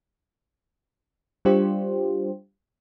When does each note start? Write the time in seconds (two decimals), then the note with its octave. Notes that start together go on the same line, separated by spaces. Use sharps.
1.45 G3 D4 F4 G4 C5